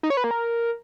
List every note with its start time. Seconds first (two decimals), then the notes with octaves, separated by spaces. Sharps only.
0.03 D#4
0.10 C#5
0.17 B4
0.24 A#3
0.31 A#4